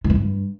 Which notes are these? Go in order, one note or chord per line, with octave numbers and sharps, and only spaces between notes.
D#3
E3
G2